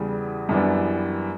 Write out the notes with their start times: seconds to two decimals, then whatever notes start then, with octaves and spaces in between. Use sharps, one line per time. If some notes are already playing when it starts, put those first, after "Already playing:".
Already playing: E2 C#3 G3
0.49 F#2 E3 G3 B3 D4